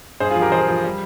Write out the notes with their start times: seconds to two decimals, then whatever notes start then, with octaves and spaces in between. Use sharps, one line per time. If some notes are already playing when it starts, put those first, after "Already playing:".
0.20 G2 G#4 C5
0.31 F4 G#4
0.36 F3
0.41 G4 A#4
0.52 F3 G#4 C5
0.68 F3
0.84 G3